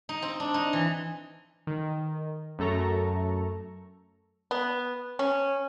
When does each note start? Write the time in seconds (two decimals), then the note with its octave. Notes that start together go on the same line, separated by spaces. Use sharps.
0.09 D#4
0.22 C4
0.40 D4
0.54 D#4
0.73 E3
1.67 D#3
2.59 F#2 A3 A4 A#5 C#6
4.51 B3
5.19 C#4